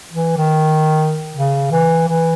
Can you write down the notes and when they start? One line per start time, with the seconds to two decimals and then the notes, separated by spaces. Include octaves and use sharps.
0.13 E3
0.37 D#3
1.36 C#3
1.72 E3
2.08 E3